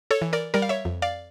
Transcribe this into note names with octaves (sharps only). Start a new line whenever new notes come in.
A4 C#5
E3
A#4 D5
G3 A#4 D5
F5
C#5 E5
F2
D5 F5